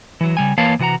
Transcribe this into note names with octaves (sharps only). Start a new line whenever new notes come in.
E3 F#3
C#3 G3 G#5
E3 A#3 B4 C#5 F5 A5
C3 E3 F#4 F#5 A#5